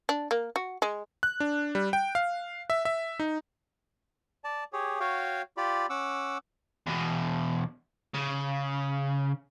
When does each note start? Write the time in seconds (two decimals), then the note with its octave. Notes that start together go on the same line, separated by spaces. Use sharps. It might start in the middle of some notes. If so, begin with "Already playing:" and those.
0.09 D4
0.31 A#3
0.56 F#4
0.82 G#3
1.23 F#6
1.40 D4
1.75 G3
1.93 G5
2.15 F5
2.70 E5
2.85 E5
3.20 D#4
4.44 D5 A5
4.73 G4 G#4 C#5
5.00 F#4 C#5 F5 G5
5.57 F4 G4 D5 B5
5.90 C#4 F#5 D6 E6
6.87 E2 B2
8.14 C#3